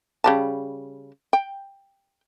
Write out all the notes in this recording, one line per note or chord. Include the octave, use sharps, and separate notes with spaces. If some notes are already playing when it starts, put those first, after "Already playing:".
C#3 G3 A5
G5